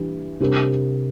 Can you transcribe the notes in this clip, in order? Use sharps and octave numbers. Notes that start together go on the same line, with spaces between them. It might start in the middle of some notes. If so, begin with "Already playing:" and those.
Already playing: E3 G3 D4
C3 G3 D4 G4 A#4